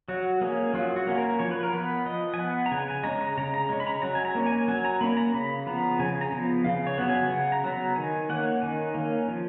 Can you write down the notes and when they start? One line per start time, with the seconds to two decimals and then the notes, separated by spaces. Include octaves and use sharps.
0.08 F#3 F#4
0.41 A#3 C#4 G#4
0.74 F#3 F4
0.96 F#4
1.07 A#3 C#4
1.18 A#4
1.39 F3 C#5
1.51 B4
1.63 A#4
1.73 B3 B4
2.06 F3 D#5
2.34 G#5
2.38 B3 F#5
2.66 A#5
2.71 C#3 G#5
2.88 G#5
3.03 G#3 C#4 A#5
3.21 A#5
3.37 C#3 A#5
3.54 A#5
3.69 G#3 C#4
3.80 B5
3.87 A#5
4.02 F#3 A#5
4.15 G#5
4.25 A#5
4.35 A#3 C#4
4.46 G#5
4.68 F#3 G#5
4.85 A#5
5.01 A#3 C#4 B5
5.17 A#5
5.34 C#3 B5
5.66 F3 B3 A#5
5.99 C#3 G#5
6.21 A#5
6.32 F3 B3
6.64 C#3 F5
6.87 C#5
6.98 F#3 B3
7.09 G#5
7.30 C#3 F#5
7.52 A#5
7.64 F#3 B3
7.74 A#5
7.96 D#3 G#5
8.29 A#3 C#4 F#5
8.62 D#3 G#5
8.94 A#3 C#4
9.28 F3